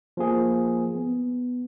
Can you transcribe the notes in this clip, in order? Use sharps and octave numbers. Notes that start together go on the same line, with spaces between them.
F3 A#3 G#4
B3